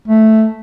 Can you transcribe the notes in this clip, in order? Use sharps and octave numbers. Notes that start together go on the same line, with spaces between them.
A3